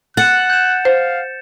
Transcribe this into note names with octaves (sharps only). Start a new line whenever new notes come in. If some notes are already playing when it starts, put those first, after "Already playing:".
F#5 F#6 A6 C#7 E7
G6 E7
C5 F5